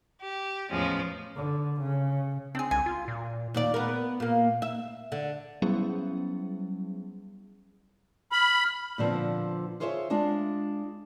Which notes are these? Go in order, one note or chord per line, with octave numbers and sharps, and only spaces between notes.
G4
E2 A2 F3 G#3 C#4
D3
C#3
C4 D4 G#4
C2 G#5
F4
A#2
D#2 A#2 D5
B3 A#4
A#2 A#3
E5
D3
F#3 G3 B3 C#4 E4 G#4
B5 F6
A#2 D3 F3 B3 C4
F4 G#4 C5 C#5 D#5 E5
G#3 D4 F4